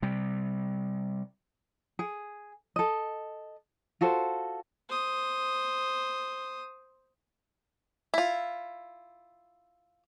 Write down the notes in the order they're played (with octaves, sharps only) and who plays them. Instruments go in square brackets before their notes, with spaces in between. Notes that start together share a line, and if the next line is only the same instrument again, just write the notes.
[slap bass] C3 G3
[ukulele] G#4
A4 D#5
F4 F#4 A4 C5
[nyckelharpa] C5 D#6
[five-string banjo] E4 F4